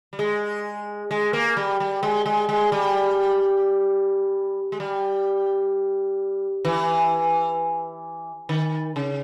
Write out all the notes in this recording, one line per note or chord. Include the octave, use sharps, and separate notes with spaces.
G3
G#3
G#3
A#3
G3
G3
G#3
G#3
G#3
G3
G#3
G3
E3
D#3
C#3